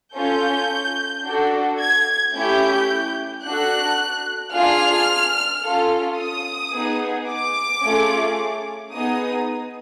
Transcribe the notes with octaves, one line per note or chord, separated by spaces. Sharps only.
C#4 F4 A4 G6
D4 F#4 A4
G#6
A3 C#4 E4 G4 G6
D4 F#4 A4 F#6
D4 F4 G#4 F6
C#4 F4 A4
D#6
B3 D#4 G#4
D6
A3 C#4 F4 G#4
B3 D#4 G#4 D#6